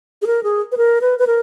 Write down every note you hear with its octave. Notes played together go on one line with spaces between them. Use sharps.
G#4
A#4
G#4
B4
A#4
B4
B4
A#4